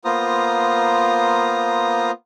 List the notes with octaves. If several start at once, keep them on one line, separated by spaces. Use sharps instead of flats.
A#3 B3 F4 C5 A#5 D#6